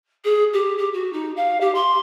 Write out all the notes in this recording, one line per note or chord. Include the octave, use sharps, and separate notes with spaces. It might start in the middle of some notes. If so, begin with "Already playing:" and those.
G#4
G4
G4
F#4
D#4
F5
G4
C6